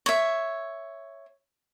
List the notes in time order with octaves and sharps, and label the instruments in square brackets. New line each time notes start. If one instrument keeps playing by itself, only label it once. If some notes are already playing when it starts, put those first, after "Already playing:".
[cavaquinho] C#5 E5